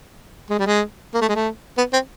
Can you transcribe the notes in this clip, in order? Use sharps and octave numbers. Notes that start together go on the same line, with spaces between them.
G#3
G3
G#3
A#3
A3
G#3
A3
B3
C4